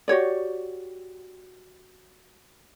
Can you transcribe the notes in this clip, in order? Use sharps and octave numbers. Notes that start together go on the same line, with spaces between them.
F#4 G4 C#5 D5